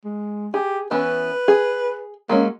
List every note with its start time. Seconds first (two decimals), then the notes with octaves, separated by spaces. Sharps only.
0.05 G#3
0.54 G4 G#4
0.91 E3 B3 C#4 B4
1.48 G#4
2.29 F#3 G#3 A#3 C#4